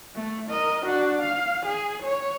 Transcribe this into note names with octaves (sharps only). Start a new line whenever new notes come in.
A3
A#4 D#5
D4 F#4
F5
G#4
C#5